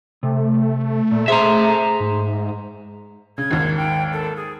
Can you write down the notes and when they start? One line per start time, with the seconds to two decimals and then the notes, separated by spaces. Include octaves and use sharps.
0.23 C3 A3
1.11 A#2
1.28 G#4 C5 E5 A#5
2.00 G#2
3.38 C#3 G#6
3.51 G#1 D#2
3.77 G5
4.12 A4
4.36 G#4